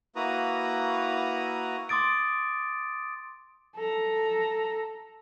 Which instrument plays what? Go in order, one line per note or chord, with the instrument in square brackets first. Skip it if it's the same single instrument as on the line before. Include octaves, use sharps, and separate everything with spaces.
[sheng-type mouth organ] A#3 E4 F#4 B4 A#5 D#6
[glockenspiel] C6 D6 D#6 A6 D7
[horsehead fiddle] A4 A#5